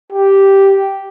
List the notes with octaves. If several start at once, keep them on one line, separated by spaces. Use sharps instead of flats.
G4